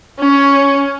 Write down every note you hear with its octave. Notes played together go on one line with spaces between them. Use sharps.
C#4